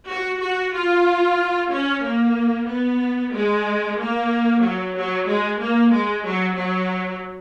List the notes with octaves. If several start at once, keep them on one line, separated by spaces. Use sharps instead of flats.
F#4
F#4
F4
C#4
A#3
B3
G#3
A#3
F#3
F#3
G#3
A#3
G#3
F#3
F#3